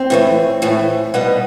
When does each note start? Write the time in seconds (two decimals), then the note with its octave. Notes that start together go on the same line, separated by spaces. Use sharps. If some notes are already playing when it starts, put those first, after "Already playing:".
Already playing: C4
0.10 A2 E3 A3
0.62 A2 E3 A3
1.14 B2 G3 B3 D#4